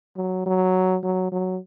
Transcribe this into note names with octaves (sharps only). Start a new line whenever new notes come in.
F#3
F#3
F#3
F#3